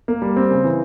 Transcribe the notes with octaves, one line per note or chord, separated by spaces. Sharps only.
A#3
G3
C4
C#3
E3